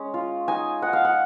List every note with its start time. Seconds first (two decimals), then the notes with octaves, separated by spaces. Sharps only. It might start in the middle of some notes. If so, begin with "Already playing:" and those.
Already playing: G#3 C#4
0.14 F4
0.48 D#4 G#5
0.82 D#4 F#5
0.93 F5
1.05 F#5